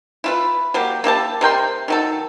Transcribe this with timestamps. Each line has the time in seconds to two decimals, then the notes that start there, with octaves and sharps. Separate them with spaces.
0.24 E4 F4 B4
0.74 F#3 A#3 G4
1.04 A#3 E4 G4 A5
1.41 C3 A#4 G5 C6
1.88 D#3 F#3 A4